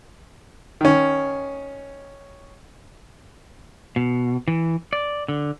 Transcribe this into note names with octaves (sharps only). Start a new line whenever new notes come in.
D#3 C#4
B2
E3
D5
D3